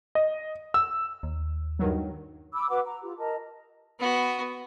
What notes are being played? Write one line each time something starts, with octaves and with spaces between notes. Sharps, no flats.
D#5
E6
D#2
G2 D#3 F#3
B5 D6 E6
F#4 B4 F#5 D6
A#5
F4 G4
A#4 D#5 A5 A#5
B3 F#4